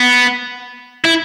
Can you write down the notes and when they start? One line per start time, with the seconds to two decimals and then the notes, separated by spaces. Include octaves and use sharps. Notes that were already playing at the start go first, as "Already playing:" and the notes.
Already playing: B3
1.05 E4